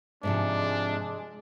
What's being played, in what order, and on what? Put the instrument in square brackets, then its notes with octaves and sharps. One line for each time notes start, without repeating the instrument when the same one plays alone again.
[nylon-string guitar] G#2 C3 F3 [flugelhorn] G#3 [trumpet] D4